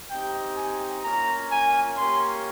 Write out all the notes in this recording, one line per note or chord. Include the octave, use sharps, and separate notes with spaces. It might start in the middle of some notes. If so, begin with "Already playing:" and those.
C4 D#4 G4 G5
G#5
A#3 C#4 F4 A#5
G#5
A#3 C#4 G4 C6